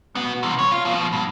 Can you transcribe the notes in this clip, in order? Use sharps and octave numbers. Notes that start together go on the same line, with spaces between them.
B3 F#4
C3 E3
C#5
F4
B2 F3
G2